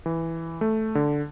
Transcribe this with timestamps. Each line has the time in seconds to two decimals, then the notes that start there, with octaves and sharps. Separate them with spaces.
0.06 E3
0.61 A3
0.95 D3